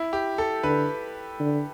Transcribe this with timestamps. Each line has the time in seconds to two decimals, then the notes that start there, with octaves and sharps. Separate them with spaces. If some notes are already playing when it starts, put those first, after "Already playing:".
Already playing: E4
0.13 G4
0.38 A4
0.63 D3 B4
1.39 D3